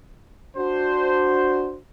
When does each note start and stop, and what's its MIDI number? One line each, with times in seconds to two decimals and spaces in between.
0.56 1.77 62
0.56 1.77 66
0.56 1.77 72